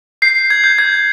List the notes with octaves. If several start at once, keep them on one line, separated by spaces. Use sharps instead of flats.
G6 C7
G#6
G6
G#6